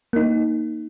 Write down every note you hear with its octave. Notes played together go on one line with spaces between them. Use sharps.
A#3 D#4